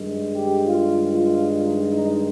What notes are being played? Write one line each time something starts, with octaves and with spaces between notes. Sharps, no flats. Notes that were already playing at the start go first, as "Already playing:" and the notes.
Already playing: G2 D#3 G#3
G4
F4
F4
D#4
D#4